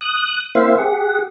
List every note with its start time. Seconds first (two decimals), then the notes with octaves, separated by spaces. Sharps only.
0.01 D#6 F#6
0.55 A#3 C4 E4 C5 E5 F5
0.78 G4 G#4 F#5